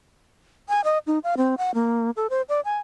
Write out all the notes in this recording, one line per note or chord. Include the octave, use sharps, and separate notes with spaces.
G#5
D#5
D#4
F5
C4
F#5
A#3
A4
C5
D5
G#5